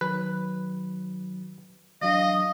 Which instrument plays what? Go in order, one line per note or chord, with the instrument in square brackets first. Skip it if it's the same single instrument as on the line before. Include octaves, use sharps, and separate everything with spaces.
[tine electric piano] D#3 F#3 [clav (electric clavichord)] B4
[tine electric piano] E3 F#3 D4 [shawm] D#5 [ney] F5